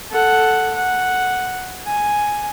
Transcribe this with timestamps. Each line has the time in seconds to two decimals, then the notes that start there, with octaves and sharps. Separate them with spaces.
0.11 A4 F#5
0.75 F#5
1.86 G#5